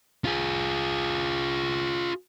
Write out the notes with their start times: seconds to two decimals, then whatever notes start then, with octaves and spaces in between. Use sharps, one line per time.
0.25 F4 G#4